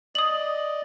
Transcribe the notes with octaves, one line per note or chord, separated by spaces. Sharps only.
D5 D#5 D#6 F#7